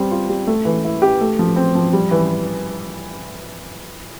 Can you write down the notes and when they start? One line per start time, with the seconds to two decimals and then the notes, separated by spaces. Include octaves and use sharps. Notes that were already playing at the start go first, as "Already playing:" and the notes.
Already playing: G3 C4
0.11 F4
0.29 G3
0.47 A3
0.65 E3
0.84 E4
1.02 G4
1.21 A3
1.39 F3
1.56 C4
1.75 F3
1.93 G3
2.11 E3